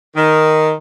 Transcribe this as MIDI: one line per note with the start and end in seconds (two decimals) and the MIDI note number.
0.15 0.72 51